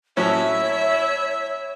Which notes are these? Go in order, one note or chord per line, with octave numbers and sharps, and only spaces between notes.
A2 F#3 C#4 E4 C#5 E5